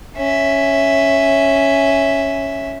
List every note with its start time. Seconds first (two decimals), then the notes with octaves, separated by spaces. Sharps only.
0.16 C#4 E5